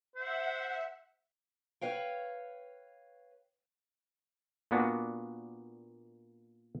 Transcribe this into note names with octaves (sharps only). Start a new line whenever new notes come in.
C5 E5 F#5
B4 C#5 F5 G5
A#2 A#3 B3 D4 F#4